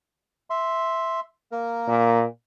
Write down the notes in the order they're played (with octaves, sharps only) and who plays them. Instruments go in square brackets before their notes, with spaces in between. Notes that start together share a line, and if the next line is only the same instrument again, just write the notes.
[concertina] E5 C6
A#3 A#4
[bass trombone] A#2